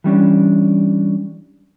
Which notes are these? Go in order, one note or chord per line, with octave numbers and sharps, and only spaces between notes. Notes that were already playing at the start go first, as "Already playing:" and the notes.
E3 G3 C#4 D4